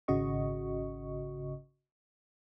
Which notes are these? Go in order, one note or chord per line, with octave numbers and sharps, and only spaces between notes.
G#1 C#3 F#4 D#5 C#6